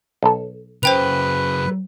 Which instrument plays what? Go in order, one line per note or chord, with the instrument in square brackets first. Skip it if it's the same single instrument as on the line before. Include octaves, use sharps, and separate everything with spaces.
[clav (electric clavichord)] B1 A4
[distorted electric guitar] F#2 C#3 [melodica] B4 [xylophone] C5 G5 F7